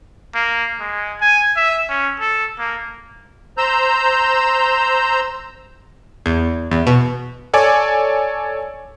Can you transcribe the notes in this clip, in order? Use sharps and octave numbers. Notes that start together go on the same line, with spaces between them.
A#3
G#3
G#5
E5
C#4
A4
A#3
C5 A#5 E6 G6
E2
E2
B2
A4 C#5 D5 G#5 D6